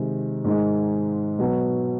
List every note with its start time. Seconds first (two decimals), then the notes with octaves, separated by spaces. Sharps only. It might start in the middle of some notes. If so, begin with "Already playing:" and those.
Already playing: C3 D#3 G#3
0.44 G#2 D#3 G#3
1.39 B2 F#3 B3